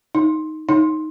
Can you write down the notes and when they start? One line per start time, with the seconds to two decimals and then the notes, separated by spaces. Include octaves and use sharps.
0.15 D#4
0.69 D#4